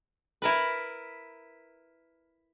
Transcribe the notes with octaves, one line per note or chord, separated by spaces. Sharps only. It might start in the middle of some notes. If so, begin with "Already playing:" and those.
E4 A#4 B4